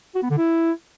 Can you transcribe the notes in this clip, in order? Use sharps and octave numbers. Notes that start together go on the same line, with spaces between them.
F#4
B3
D3
E4